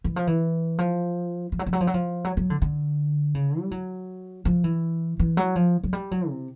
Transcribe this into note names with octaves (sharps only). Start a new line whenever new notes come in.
E3
F3
E3
F3
F3
F#3
F3
F#3
F3
F#3
F3
F#3
F#3
D3
D3
C#3
G3
F#3
F3
E3
E3
F#3
F3
F#3
G3
F#3
C3